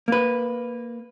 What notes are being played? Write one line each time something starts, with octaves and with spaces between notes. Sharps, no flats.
A#3 B4